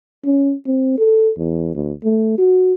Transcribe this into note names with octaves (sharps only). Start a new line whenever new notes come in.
C#4
C4
A4
E2
D2
A3
F#4